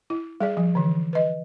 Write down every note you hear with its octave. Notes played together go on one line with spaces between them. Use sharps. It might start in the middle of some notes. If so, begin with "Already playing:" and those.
E4
G3 G#4 D5
F3
D3 E3
B4 D#5